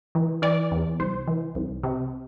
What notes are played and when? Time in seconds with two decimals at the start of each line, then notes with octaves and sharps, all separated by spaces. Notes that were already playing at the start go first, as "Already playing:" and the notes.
0.15 E3
0.42 E3 D5
0.71 E2
1.00 C2 C5
1.28 E3
1.55 C2
1.83 C3